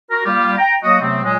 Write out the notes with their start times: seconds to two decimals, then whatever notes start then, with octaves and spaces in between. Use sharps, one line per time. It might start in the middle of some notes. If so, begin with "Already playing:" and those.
0.10 F#4 A#4
0.25 G3 A#3 F4 G4
0.58 G5 A#5
0.83 F#3 A#3 F#4 D#5
1.00 C3 F#3 A3 B3 C4
1.24 A#2 F#3 G#3